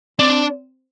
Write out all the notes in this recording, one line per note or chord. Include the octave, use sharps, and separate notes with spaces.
C4 D4